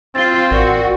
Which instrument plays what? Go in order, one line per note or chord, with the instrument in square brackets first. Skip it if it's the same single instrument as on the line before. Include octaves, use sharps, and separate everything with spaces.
[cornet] C4 [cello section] F4 [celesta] A6 G7
[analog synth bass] A1 [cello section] F#4 [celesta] A#4 D5